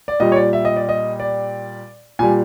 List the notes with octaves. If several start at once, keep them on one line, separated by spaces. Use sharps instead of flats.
D5
A#2 G3 D#5
C#5
D5
E5
D#5
D5
D#5
D5
A#2 G3 G#5